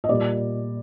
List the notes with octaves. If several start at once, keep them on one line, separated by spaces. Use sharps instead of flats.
D#5
A#2 G3 A#3 D5